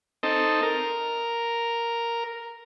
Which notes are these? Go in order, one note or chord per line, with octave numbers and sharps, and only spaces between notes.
C4 D#4 A4
A#4